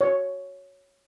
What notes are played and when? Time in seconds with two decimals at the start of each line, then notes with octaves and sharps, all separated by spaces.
0.01 C#5